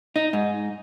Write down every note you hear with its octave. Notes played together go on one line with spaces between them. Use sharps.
D#4
G#2